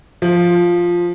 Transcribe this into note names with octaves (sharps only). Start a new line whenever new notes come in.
F3